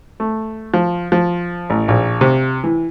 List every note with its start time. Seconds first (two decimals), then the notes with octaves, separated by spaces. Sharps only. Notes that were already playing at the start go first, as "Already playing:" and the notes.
0.20 A3
0.74 F3
1.12 F3
1.70 A1
1.88 A#1
2.21 C3
2.64 E3